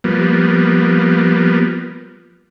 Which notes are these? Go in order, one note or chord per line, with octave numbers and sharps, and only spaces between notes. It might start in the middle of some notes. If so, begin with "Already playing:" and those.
F3 G3 A#3 B3